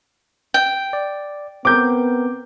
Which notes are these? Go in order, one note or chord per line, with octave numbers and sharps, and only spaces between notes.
G5
D5
B3 C4 A#4 D6 G6